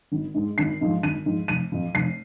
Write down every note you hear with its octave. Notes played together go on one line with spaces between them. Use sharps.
G#1
G#2 G#3
G#1 C7
G#2 F3 G#3
G#1 D#7
G#2 F3 G#3
F1 D#7
F2 F3
F1 C7